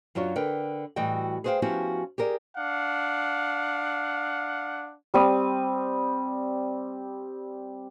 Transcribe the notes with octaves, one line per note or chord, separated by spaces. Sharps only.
F#2 F#3 D4 F4 C#5
D3 A#4 B4 G5
A2 E3 G3 F#4 D#5 G5
G#4 B4 C5 D5 F5 G5
F3 B3 C#4 E4 F#4 G4
G4 G#4 A#4 D5
D4 F5 F#5
G3 C4 D#6